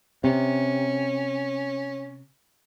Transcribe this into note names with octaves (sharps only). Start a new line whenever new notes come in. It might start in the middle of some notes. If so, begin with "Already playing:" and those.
C3 C#4